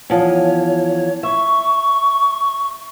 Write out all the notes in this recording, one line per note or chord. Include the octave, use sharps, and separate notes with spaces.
E2 F3 C#5
E5 C#6